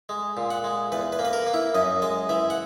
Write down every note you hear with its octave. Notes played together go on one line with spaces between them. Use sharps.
G#3
A#2
F#5
G#3
E2 B4
B4
A#3
B4
A#4
A#3
E4
F#2 D#5
G#3 D#5
E3 E5
F#5